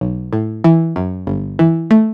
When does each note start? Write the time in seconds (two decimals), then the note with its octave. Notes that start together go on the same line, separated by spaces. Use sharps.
0.01 B1
0.33 A2
0.64 E3
0.96 F#2
1.27 G1
1.59 E3
1.91 A3